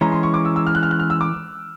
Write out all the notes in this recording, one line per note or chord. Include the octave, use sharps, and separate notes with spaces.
E3 G#3 C#4 A#5
C6
C#6
D6
E6
E6
F6
F#6
F6
F#6
F6
E6
D6